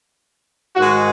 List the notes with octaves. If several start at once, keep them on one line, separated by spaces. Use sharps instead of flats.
G#2 D#3 G#3 F#4